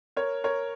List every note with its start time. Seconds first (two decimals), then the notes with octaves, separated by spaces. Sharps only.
0.16 A#4 C#5
0.44 A#4 C#5